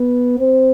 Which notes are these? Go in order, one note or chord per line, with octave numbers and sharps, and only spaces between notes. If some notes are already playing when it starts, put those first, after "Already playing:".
Already playing: B3
C4